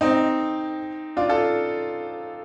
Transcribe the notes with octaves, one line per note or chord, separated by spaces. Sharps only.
C4 D#4
D4 F4
F4 A4